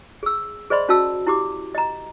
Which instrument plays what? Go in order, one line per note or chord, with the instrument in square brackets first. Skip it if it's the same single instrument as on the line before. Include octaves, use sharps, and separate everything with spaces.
[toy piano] G#4 E6
G#4 C5 D5 D#5 B5 C6
C#4 F#4 D#5 A5 E6
E4 G4 D6
D#5 A#5